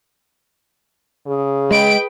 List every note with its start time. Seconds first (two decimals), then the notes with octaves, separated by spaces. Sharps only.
1.27 C#3 G#4
1.71 G#3 B4 G5 D7